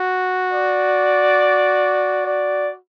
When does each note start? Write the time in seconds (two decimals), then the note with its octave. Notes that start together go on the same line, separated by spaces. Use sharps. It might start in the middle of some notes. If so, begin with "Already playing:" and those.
Already playing: F#4
0.53 D5
2.26 D5